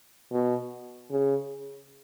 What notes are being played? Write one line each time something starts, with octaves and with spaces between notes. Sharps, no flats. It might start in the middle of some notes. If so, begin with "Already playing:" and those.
B2
C#3